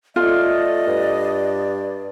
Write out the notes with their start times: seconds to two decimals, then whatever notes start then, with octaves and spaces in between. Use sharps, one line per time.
0.16 A3 F4 D5 D#5
0.87 G2